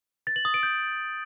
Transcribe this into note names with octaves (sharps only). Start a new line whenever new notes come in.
A6
F#7
D#6
D7
G6